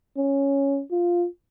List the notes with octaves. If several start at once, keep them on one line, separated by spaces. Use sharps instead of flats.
C#4
F4